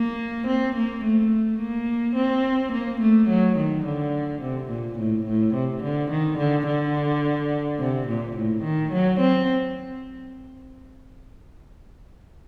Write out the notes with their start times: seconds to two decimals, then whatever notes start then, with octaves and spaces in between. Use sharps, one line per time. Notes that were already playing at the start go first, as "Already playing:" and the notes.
Already playing: A#3
0.47 C4
0.76 A#3
1.04 A3
1.60 A#3
2.16 C4
2.72 A#3
3.01 A3
3.29 F#3
3.57 D#3
3.85 D3
4.42 C3
4.69 A#2
4.98 A2
5.26 A2
5.55 C3
5.83 D3
6.11 D#3
6.38 D3
6.67 D3
7.79 C3
8.08 A#2
8.36 A2
8.63 D#3
8.92 F#3
9.20 C4